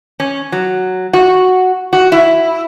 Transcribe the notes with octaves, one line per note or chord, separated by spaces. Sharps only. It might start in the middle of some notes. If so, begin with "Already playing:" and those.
C#4
F#3
F#4
F#4
E4